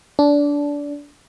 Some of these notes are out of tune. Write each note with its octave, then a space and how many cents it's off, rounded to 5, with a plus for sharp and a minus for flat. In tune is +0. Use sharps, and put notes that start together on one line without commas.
D4 -20